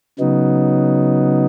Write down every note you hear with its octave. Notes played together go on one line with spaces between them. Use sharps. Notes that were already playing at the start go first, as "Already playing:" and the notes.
C#3 F#3 B3 D#4